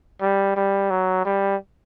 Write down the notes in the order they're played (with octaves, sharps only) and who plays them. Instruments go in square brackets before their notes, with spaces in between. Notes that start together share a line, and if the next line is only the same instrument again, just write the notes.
[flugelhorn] G3
G3
F#3
G3